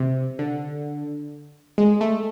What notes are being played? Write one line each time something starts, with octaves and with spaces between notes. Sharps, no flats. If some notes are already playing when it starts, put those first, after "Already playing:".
Already playing: C3
D3
G#3
A3